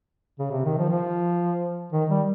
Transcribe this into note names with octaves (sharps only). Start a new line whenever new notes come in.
C#3
C3
D#3
F3
F3
D#3
G3